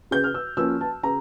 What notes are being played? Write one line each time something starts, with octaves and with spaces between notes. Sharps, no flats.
C#3 G6
F6
E6
F3 A#3 C#4 E6
A5
C#3 A#5